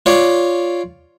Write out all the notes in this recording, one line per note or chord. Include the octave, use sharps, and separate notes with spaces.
F4 C#5 D5